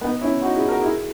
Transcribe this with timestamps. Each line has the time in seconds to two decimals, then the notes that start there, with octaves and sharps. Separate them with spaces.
0.01 B3 D#4
0.21 C#4 E4
0.42 D#4 F#4
0.55 E4 G#4
0.69 F#4 A#4
0.82 E4 G#4